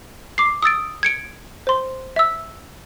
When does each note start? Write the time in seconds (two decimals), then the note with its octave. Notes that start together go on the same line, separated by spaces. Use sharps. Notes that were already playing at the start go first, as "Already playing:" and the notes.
0.38 D6 C7
0.63 D#6 E6 A6 D7
1.03 G#6 C#7 D7
1.67 C5 C6
2.16 E5 E6